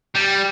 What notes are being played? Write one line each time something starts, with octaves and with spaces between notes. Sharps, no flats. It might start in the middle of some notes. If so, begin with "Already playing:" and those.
G3